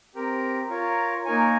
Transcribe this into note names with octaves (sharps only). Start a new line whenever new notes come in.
C4 G4 A#4
F4 A#4 C#5
A#3 D#4 A#4 C#5 G#5